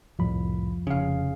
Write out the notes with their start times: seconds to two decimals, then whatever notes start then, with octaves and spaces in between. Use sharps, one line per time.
0.19 C2 F2 A2 F3 B5
0.87 F1 C#3 G#4 F5